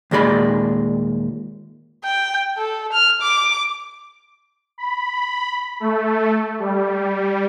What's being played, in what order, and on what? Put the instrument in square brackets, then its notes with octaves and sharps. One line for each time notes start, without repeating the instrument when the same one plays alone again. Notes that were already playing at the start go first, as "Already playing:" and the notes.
[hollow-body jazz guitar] D#2 A#2 G#3 D5 B5
[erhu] G5
A4
F6
D6
[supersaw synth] B5
A3
G3